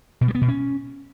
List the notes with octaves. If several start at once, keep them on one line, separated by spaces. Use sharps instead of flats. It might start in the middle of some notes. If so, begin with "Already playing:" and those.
B2
G3
B3
B2
C#4